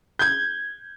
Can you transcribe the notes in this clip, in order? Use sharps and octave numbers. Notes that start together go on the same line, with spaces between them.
G6 G#6